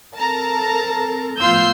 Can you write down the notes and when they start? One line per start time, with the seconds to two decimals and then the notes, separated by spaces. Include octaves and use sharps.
0.15 C4 A4 A#4 A5 A#5 A#6
1.41 A2 F3 B3 F4 E6 G6 C7